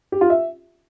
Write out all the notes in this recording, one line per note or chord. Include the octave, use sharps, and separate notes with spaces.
G4
F4
E5